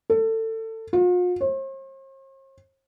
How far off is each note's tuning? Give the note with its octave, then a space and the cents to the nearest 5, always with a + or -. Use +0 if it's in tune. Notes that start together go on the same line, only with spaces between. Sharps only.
A4 +25
F4 +45
C5 +45